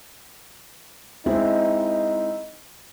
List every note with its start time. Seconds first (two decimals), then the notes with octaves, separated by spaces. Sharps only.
1.26 G#3 C4 D#4 E4